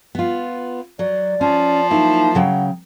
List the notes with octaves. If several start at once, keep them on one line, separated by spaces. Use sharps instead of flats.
B3 F4
F#3 D5
F3 C#4
F#3 A#3 D#4 E4
C#3 F#3 F#5 G5